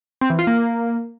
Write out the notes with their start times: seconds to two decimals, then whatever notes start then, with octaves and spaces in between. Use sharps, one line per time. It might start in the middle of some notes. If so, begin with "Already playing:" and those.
0.21 C4
0.30 E3
0.39 F4
0.47 A#3